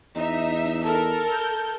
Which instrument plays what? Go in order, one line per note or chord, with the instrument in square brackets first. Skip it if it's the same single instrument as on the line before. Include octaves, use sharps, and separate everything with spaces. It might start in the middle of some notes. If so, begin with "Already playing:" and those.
[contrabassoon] E2 [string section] D#4 E5
[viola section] A4 A#4 [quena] A5
[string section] G6